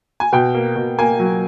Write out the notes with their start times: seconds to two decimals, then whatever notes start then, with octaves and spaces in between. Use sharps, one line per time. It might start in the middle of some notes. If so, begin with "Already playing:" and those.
0.20 G#5
0.33 B2 G5
0.55 A#3
0.76 B2
0.99 A#3 G#5
1.20 F#3